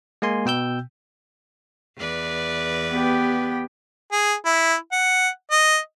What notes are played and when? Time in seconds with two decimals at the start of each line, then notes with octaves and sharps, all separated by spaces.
0.22 G#3 A#3 G#5 C6
0.46 B2 G5 E6 G6
1.97 E2 B4 D5
2.90 B3 G4
4.12 G#4
4.45 E4
4.92 F#5
5.51 D#5